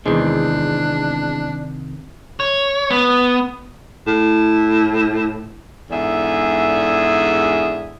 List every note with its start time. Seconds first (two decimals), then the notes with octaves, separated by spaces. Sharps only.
0.06 E2 C3 D#3 G#3 C4 D4
2.40 C#5
2.90 B3
4.07 A2
5.90 E2 G#2 D3 G#4 E5